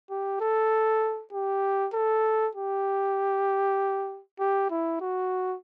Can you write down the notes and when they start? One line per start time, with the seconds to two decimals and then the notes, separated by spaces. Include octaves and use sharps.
0.10 G4
0.41 A4
1.33 G4
1.93 A4
2.55 G4
4.39 G4
4.71 E4
5.01 F#4